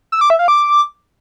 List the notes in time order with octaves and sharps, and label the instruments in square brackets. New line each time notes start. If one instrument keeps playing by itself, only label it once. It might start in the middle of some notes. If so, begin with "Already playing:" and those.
[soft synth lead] E6
D6
E5
F5
D6